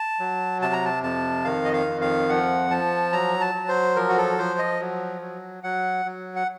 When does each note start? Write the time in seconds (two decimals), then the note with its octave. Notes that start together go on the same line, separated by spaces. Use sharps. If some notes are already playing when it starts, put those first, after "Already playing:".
Already playing: A5
0.19 F#3
0.61 C3 A5
0.73 A#5
0.85 A5
1.03 F2 A5
1.44 D#3 F5
1.65 D#5
1.73 F5
1.86 F2
2.01 F5
2.29 F3 F#5
2.70 F3 A5
3.12 F#3 A#5
3.41 A5
3.55 F#3
3.68 C5
3.96 F3 A#4
4.09 F#4
4.17 A4
4.38 F3 C5
4.59 D#5
4.80 F#3
5.21 F#3
5.63 F#3 F#5
6.05 F#3
6.36 F#5